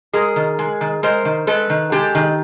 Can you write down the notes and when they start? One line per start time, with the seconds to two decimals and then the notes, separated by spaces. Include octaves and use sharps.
0.13 G#3 G#4 A#4
0.36 D#3
0.59 G#3
0.81 D#3
1.03 G#3 A#4 C5
1.25 D#3
1.47 G#3 A4 B4
1.70 D#3
1.92 G#3 G4 A4
2.15 D#3